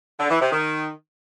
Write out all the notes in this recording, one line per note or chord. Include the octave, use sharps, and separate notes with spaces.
D3
E3
C3
D#3